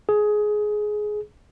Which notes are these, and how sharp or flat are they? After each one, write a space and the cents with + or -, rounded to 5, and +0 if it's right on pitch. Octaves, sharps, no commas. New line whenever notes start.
G#4 +15